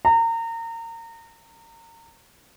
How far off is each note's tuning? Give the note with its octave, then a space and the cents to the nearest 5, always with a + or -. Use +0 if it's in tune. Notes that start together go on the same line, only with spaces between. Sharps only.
A#5 -30